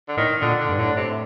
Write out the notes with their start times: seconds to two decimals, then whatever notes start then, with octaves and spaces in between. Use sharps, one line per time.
0.08 D3
0.17 A2 D#3
0.41 A#2 D3
0.60 D3
0.69 G2
0.78 A2 D3
0.97 C3